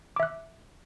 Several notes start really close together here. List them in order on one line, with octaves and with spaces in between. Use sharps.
D6 E5 F#6